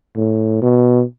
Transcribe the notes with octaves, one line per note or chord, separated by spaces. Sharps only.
A2
B2